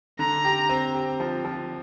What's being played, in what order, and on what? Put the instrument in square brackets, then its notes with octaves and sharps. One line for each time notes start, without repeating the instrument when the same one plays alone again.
[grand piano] D3 [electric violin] A#5
[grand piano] G4
C4
G4
F3
F3